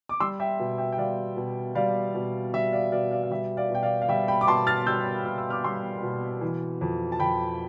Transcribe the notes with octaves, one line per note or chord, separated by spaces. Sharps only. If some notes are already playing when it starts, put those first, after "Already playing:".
D6
G3 C6 E6
E5 G5
B2
E5 G5
G5
G3 D5 F5
B2
G3 D5 F5
B2
G3 E5
D5 F5
B2 D5 F5
D5 F5
F5
G3 E5
D5 F5
B2 G5
D5 F5
F5
G3 E5 G5
G5 B5
D6
B2 A5 C6
F6 A6
G3 E6 G6
B2 F6
E6
D6 F6
G3 C6 E6
B2
E3
F2
A5
F2 G5 B5